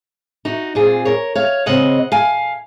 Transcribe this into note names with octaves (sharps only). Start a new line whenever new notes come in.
D#4 F#4
A#2 G#3 C4 F4 G#4
A#4 C#5
C#5 F5
C#3 G#3 C4 D#5 F#5
F5 G#5